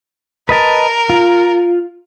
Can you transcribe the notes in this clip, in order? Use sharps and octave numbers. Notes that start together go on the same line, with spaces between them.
A#4 B4 D#5 A5
F4